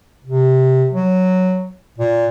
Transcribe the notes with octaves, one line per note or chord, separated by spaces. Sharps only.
C3
F#3
A#2